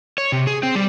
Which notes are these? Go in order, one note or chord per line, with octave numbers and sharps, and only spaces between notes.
C#5
C3
G#4
C4
G3